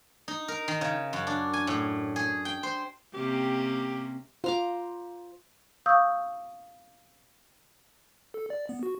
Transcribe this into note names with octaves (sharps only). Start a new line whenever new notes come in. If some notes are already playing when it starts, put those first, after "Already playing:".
D#4
A#4
D#3
C#3
F#2
D4
G#5
A2
G#4
G5
C5
C3 A#3 C#4 G4
F4 C5 A#5 D6
F5 C#6 D#6 E6 G6
A4
D5
B3
F#4